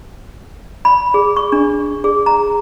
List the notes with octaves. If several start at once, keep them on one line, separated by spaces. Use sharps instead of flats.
B5
G#4
C#6
D4
G#4
A#5